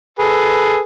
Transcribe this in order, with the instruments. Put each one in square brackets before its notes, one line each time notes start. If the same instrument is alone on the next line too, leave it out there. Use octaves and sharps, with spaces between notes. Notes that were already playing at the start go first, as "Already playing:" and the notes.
[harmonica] G#4 A4 B4